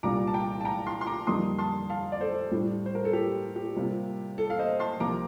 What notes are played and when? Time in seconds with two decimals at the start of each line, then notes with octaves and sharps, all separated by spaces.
0.03 C2 A#2 G3 D4 F4 A#5 D6
0.27 A5
0.34 G5 A#5
0.61 A5
0.65 G5 A#5
0.86 A5 C6
1.01 C6
1.06 A#5 D6
1.27 F2 D3 G3 A#3 D#4 C6 D#6
1.59 A5 C6
1.90 F5 A5
2.12 D5
2.21 A4 C5
2.52 A2 G3 D4
2.86 C5
2.95 A#4
3.05 A4
3.13 G4
3.56 G4
3.76 C3 G3 A#3 F4
4.38 A4
4.50 F5
4.59 C5 D#5
4.79 A5 C6
5.00 C2 C3 F3 A#3 F4 A#5 D6